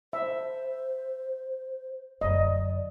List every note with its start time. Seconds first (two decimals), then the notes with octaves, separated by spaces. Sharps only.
0.13 C5 E5
2.21 F#2 D3 D5 D#5